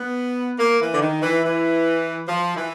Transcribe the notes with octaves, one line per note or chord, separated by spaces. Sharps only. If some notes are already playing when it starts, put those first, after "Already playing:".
Already playing: B3
A#3
E3
D3
D#3
E3
E3
F3
E3